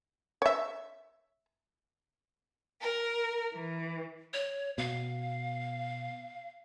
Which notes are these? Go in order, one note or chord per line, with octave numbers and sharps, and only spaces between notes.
C#5 E5
A#4
E3
C#5
B2 F5